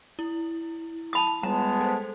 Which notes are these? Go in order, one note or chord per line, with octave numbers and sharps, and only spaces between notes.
E4
A5 B5 D#6
G3 G#3 B3 A5 A#5
A4 C5